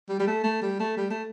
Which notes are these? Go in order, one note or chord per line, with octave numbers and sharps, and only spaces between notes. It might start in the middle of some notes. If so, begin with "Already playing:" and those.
G3
G3
A3
A3
G3
A3
G3
A3